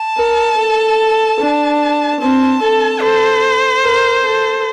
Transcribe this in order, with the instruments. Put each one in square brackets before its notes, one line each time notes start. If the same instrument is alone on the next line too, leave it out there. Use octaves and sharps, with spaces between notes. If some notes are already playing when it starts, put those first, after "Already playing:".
Already playing: [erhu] A5
[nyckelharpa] A#4
A4
D4
[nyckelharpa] C4 [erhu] A5
[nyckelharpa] A4
[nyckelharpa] A4 [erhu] C5
[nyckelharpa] A#4
A4